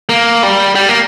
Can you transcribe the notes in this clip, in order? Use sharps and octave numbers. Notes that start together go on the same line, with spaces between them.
A#3
G3
G3
A#3